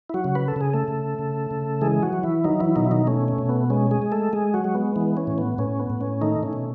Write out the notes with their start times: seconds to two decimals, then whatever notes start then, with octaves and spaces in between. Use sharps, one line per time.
0.10 E4
0.14 F#3 F#4
0.24 C#3
0.35 B4
0.48 A4
0.56 C#3 G#4
0.73 A3 A4
0.88 C#3
1.19 C#3
1.51 C#3
1.81 E3 G#3 G#4
2.03 F#3 F#4
2.13 E3
2.23 E3 E4
2.44 D#3 F#3 D#4
2.60 E3 E4
2.76 B2 D#3 D#4
2.85 E4
2.91 D#3 D#4
3.07 A3 C#4
3.28 C#4
3.38 B2
3.49 B3
3.70 G#3 C#4
3.91 G#3 G#4
4.02 G#3
4.12 A3 A4
4.33 G#3 G#4
4.54 F#3 F#4
4.64 G#3
4.75 B3
4.96 E3 B3
5.17 C#4
5.27 A2
5.38 B3
5.58 A2 C#4
5.79 B3
5.90 A2
6.01 C#4
6.21 D#3 A3 D#4
6.43 C#4
6.53 B2